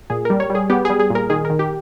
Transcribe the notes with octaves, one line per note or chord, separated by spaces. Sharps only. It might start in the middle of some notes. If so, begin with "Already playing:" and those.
A#2 G#4
G3 A#4
C#5
G3
G#4
B3 G4
G3 G#4
G#4
A#2
A#4
D#3 G#4
D#3 A#4
G4